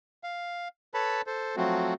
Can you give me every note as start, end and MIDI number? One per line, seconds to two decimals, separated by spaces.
0.24 0.68 77
0.94 1.22 69
0.94 1.22 71
0.94 1.22 73
0.94 1.22 81
0.94 1.22 83
1.27 1.56 69
1.27 1.56 72
1.57 1.94 53
1.57 1.94 54
1.57 1.94 57
1.57 1.94 60
1.57 1.94 66